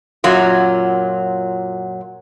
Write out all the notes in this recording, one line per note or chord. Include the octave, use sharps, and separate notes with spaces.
F#2 A#2 F#3 F4